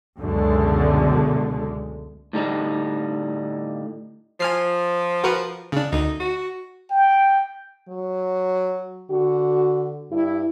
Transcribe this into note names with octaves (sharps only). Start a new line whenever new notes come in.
C#2 F#2 B2 D3 G#3 A3
A2 D3 G3 D#4
F3 G#5 F6 C7
F#4 A#4 B4
C#3 D4
D2 D#4
F#4
G5
F#3
D3 F#4
G2 E4